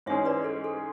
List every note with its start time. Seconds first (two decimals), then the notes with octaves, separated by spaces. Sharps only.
0.06 G#2 E3 G#3 C#4 G#4 C#5 E5
0.25 B4 D5
0.44 A4
0.64 A4